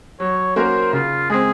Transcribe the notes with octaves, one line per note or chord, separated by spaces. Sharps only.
F#3 C#5
A#3 C#4 F#4 A#4 C5
C#3 F4
G#3 C4 G#4